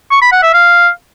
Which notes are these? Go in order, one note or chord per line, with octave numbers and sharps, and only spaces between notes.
C#6
B5
F#5
E5
F5